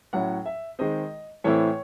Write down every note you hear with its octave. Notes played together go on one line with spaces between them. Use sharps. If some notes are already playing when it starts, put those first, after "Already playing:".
A2 F#3 C#4 E4 F#5
E5
D#3 G#3 C4 D#5
A2 E3 A3 C4 E4 C#5